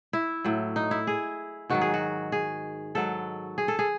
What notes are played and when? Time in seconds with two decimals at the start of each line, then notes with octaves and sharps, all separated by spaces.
0.13 E4
0.45 A2 F#3
0.76 D#4
0.91 E4
1.07 G#4
1.70 G#2 D#3 F#3 F#4
1.81 G#4
1.94 F#4
2.32 G#4
2.95 G#2 F#3 A4
3.58 G#4
3.68 A4
3.79 G#4